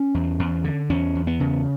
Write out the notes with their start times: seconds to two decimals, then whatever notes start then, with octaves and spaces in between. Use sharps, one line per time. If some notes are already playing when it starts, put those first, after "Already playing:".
Already playing: C#4
0.14 E2
0.39 E2
0.64 D3
0.90 E2 C#4
1.15 E2
1.27 B3
1.40 C#3